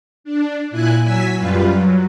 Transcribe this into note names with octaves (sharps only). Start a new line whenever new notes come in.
D4
A#2 E4 G#5 F#6
F#3 G#5 E6 B6
F#2 G3 F4 B4
F#3